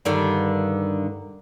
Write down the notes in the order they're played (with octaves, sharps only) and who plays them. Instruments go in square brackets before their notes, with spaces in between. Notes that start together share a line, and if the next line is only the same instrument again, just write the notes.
[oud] G2 D3 D#3